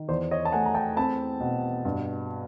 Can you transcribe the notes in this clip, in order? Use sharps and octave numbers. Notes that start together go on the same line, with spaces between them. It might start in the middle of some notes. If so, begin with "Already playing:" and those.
Already playing: D#3
E2 C5 D5
C#5 D#5
A5
A3 F#5 G#5
A#5
G5 A5
C4 A5 B5
B2
G2